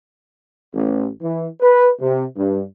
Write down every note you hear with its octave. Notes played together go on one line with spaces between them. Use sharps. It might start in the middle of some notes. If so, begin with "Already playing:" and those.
A1
E3
B4
C3
G2